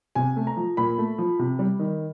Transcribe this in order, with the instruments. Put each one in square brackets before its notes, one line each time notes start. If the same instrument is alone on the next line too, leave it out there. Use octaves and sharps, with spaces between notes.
[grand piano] C3 G#5
A3
A#5
F3
A#2 B5
A3
F3
C3
G3
D#3